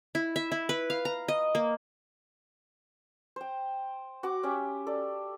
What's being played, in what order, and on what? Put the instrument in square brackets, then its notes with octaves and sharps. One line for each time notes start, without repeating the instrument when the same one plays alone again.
[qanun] E4
E5
E4
B4
F5
A#5
D#5
A#3
[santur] C5 G5
F#4 F#5 D6
C#4 G4 E5
A4 D5